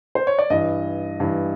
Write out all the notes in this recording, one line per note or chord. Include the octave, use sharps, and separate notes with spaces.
C5
C#5
D5
G2 E3 D#5
G2 E3